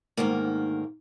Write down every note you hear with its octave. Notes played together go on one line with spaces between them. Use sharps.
D2 G#2 D#3 A#3